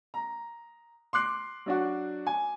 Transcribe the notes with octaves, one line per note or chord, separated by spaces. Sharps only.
A#5
C6 D6 F#6 C7
F#3 D4 F#4
G#5